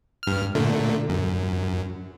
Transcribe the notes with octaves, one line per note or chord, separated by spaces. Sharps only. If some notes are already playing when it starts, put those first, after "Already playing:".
G2 F6
A#2 D3 A3
F#2